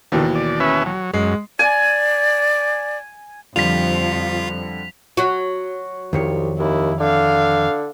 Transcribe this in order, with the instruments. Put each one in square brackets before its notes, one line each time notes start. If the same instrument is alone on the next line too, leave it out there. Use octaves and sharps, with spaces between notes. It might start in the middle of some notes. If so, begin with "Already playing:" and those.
[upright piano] D#2 B2 E3 [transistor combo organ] D3
[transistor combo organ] D5
C#4 B4 E5
F#3
[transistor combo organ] F#2 [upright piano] G#3
[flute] D5 [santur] G#5
[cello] F2 F3 [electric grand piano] D3 G3 [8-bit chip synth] F4 [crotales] B6 F7
[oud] F#3 F#4
[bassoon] C2 [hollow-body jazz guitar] F2 D#3 C#5
[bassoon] D#2 [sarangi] E4
[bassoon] D3 [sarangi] F5